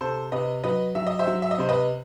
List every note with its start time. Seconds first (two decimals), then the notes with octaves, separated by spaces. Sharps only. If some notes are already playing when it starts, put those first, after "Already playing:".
0.01 C3 A4 C5
0.32 C3 B4 D#5
0.64 F#3 B4 D#5
0.95 F#3 E5
1.07 D#5
1.19 C5 E5
1.27 F#3
1.42 E5
1.51 D#5
1.58 C3 C5
1.69 B4 D#5